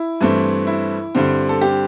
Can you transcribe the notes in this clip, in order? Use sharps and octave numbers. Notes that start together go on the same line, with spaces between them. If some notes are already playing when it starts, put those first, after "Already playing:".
Already playing: E4
G2 E3 A3 C4
E4
G2 D3 G3 C4
A4
G4